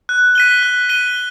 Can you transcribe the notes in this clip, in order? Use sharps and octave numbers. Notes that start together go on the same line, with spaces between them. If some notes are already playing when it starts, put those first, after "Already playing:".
F#6
B6 D#7 G7
F#6
B6 D#7 G7